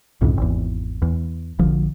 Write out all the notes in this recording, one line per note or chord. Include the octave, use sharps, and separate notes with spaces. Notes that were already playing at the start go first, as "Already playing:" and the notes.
C2 F2 G#2 C#3
G#1 E2
E2
A#1 D3 F3